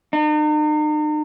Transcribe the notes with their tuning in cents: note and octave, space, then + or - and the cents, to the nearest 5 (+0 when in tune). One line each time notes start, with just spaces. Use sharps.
D#4 -45